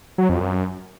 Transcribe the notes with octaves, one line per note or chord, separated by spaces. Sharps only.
F#3
F2
F#2